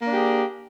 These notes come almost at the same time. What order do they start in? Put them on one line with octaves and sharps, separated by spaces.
A#3 D4 G4 G#4